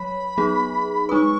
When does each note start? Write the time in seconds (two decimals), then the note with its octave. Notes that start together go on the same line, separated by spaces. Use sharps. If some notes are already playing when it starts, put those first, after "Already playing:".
Already playing: F#3 C#5 B5
0.37 F#3 B3 D#4 G#4
1.09 G#3 D#4 B4 C#6 D#6